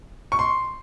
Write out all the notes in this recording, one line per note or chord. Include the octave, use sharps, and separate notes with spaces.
C#6
C6